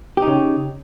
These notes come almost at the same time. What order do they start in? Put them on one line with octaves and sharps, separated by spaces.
G4 D#4 C#3